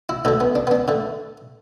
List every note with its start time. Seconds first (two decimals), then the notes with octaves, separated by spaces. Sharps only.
0.09 E4
0.25 D2 D3 A3 A4
0.40 B3
0.55 D4
0.67 B3
0.71 D4
0.88 D3 A3